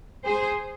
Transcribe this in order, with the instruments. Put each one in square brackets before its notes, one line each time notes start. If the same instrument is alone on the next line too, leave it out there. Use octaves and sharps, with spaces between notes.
[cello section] G#4 C5